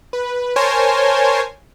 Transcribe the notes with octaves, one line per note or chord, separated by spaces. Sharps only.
B4
A#4 C5 C#5 G#5 A5 C6